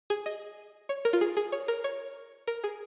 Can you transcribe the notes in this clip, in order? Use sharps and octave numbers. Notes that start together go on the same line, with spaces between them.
G#4
D#5
C#5
A#4
F4
G#4
G#4
C#5
A#4
C#5
A#4
G#4